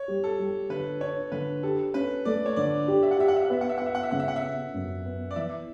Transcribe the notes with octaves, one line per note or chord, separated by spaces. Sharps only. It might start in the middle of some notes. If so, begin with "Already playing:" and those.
Already playing: C#5
G3
A4
G3
D3 B4
D4 C#5
D3 B4
G4 A4
C#4 B4
A3 D5
C#5
D3 D5
G4
E5
F#5
G4 E5
F#5
E5
F#5
B3 E5
F#5
E5
B3 F#5
E5
F#5
E5
C#3 F#5
E5
F#5
E5
B3
F#2
B3
D5
E3 E5